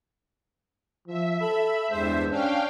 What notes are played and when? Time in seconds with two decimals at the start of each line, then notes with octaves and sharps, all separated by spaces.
1.07 F3 E5
1.41 A4 B5
1.91 E2 G2 G#3 C5
2.31 C#4 D4 F5 G5